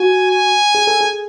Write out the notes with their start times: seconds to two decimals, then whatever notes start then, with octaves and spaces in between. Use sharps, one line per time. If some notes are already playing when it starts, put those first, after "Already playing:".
Already playing: F#4 G#5
0.31 G#5
0.75 G#4
0.87 A4
1.01 G#4